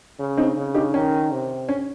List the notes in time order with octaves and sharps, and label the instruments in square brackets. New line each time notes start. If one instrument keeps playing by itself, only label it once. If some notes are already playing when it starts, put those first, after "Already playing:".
[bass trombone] C#3
[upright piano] C4 D#4
[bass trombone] C#3
[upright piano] D#4 G4
[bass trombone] D#3 [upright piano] C#4
[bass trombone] C3
[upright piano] C#4